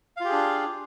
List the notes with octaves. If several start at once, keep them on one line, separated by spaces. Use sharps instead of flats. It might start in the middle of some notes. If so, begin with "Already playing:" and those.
D4 F4 G4 G#4 F5